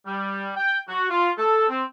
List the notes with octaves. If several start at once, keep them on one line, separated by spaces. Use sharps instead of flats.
G3
G5
F#4
F4
A4
C4